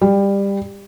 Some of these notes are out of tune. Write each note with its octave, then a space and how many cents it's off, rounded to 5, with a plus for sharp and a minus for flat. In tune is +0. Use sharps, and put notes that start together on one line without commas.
G3 +20